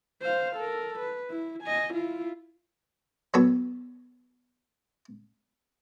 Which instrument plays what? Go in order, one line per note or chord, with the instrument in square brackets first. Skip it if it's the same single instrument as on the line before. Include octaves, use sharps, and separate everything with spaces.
[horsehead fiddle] C5 F5
A4 A#4
B4
E4
D#5 G#5
E4 F4
[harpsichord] F#3 B3 A4 C#5